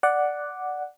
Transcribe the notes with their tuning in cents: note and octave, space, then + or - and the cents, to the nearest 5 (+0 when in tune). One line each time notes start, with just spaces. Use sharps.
D5 +0 F#5 +0 D6 +0